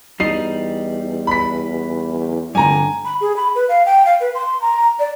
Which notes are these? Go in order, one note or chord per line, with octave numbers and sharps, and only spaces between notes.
E2 G3 D#4 C7
B5 B6
F1 G2 D3 G#5 A#5
B5
G#4
B5
B4
F5
G5
F5
B4
C6
A#5
D5